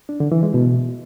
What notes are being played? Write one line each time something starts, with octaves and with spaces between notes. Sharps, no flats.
D4
D3
E3
G#3
B2